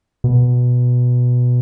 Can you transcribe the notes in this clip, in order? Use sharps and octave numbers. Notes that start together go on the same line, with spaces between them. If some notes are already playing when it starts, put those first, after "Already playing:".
B2